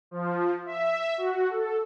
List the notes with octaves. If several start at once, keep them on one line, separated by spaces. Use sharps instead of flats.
F3
E5
F#4
A4